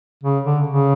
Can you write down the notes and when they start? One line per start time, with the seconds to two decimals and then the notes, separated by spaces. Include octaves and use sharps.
0.23 C#3
0.44 D3
0.67 C#3